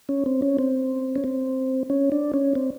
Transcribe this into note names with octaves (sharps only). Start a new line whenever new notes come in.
C#4
C4
C#4
C4
C#4
C4
C#4
D4
C#4
C4